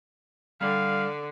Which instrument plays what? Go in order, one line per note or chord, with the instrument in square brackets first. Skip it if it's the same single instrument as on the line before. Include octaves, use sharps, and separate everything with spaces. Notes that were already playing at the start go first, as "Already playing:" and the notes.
[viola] D3 [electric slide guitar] G3 D5 [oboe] F5